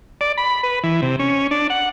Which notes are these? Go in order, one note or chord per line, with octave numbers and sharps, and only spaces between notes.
D5
B5
B4
E3
C3
C#4
D4
F#5